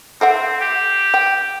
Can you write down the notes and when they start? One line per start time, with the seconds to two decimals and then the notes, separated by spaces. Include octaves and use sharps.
0.21 C4 A4 E5 F#5
0.61 G4
1.14 G5